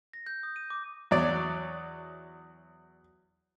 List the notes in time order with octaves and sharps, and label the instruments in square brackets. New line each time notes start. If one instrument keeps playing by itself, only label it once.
[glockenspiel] A#6
G6
D#6
D#7
D6
[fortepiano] E2 F#3 D5